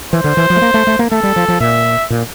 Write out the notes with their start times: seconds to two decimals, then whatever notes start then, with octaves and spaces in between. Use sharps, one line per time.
0.12 E3 C5
0.24 D3
0.37 E3
0.50 F3
0.56 A3
0.62 A#3
0.74 A3
0.87 A3
0.99 A#3
1.11 A3 A4
1.23 G3
1.36 F3
1.48 F3
1.60 A#2 E5
2.10 A#2